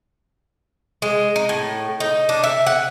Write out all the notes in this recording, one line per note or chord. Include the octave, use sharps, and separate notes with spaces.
G#3
D#4
A2
D#4
D4
E5
F#5